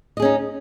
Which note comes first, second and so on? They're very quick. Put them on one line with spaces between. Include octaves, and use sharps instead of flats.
D#5 G#4 C#4 D#4